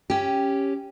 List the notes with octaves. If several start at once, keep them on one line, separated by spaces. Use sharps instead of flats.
C#4 G4